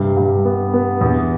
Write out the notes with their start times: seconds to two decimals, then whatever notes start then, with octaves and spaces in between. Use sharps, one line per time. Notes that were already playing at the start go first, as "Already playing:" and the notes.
Already playing: G2 C3
0.17 G2
0.45 B3
0.74 B3
1.01 E2